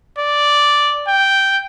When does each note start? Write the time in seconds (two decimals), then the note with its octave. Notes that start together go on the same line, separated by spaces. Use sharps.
0.18 D5
1.08 G5